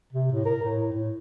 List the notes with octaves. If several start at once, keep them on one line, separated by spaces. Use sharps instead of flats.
C3
A2
A#4
A2
A2